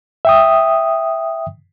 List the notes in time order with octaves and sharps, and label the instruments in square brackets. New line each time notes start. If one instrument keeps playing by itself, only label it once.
[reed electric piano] E5 G5 D#6